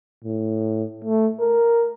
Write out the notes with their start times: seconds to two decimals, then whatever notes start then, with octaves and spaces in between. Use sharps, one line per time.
0.24 A2
1.04 A3
1.40 A#4